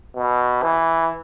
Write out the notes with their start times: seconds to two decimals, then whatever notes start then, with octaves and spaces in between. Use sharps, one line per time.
0.16 B2
0.62 E3